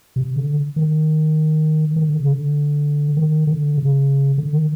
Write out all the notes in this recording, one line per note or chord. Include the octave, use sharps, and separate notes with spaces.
C3
D3
D#3
D#3
D3
C#3
D3
D#3
D3
C#3
D3
D#3